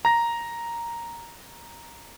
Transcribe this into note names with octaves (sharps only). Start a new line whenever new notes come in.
A#5 A#6